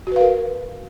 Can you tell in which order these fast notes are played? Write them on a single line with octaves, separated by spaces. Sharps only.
F#4 B4 F5 A#4